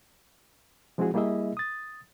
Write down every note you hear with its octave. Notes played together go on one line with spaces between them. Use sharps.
F3 G#3 C4 E4 F#4 G#4
G3 A#3 E4 G#4 D#5 E5
D#6 A6